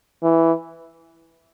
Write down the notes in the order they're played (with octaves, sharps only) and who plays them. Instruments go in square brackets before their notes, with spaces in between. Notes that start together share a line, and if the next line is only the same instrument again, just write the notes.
[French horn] E3